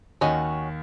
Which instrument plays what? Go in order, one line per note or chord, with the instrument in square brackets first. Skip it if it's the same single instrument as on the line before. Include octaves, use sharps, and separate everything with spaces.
[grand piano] D#2 D#3 [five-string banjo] C#4 F#4 D#5